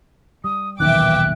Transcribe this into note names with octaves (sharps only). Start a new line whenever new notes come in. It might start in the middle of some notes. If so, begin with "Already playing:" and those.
G3 D#6
D#1 B1 D#3 E3 E5 G5 D6 F#6